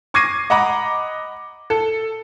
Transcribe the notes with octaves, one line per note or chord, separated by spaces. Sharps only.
C#6 D6 G#6 A#6 C7 D#7
D#5 F#5 A#5 B5 D6
A4